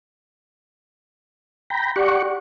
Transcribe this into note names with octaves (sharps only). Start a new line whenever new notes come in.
G5 A#5 B5
G4 D5 F#5 C#6